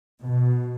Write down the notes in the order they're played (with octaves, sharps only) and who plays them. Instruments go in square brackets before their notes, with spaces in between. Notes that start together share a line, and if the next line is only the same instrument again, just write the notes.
[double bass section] B2